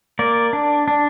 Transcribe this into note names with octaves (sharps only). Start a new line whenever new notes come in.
A#3 D5
D4
D4